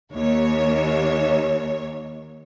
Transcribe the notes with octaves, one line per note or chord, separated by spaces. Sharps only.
D#2 C#5